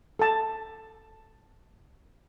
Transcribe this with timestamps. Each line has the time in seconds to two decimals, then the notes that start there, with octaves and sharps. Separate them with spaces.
0.19 A4 A5